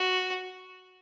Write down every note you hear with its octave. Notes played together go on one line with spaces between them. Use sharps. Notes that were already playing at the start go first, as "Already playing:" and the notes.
Already playing: F#4